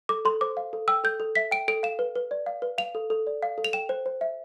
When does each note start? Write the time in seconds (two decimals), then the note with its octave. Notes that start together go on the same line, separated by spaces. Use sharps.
0.09 A4 D6
0.25 A4 C6
0.41 C5 D6
0.57 F5
0.73 A4
0.88 G5 E6
1.04 A4 G6
1.20 A4
1.35 E5 B6
1.51 G5 D7
1.68 A4 D7
1.83 F5 E7
1.99 B4
2.15 B4
2.31 D5
2.46 F5
2.62 B4
2.78 F5 F7
2.95 A4
3.10 A4
3.27 D5
3.43 F5
3.58 A4
3.64 F7
3.73 G5 E7
3.89 C5
4.06 C5
4.21 E5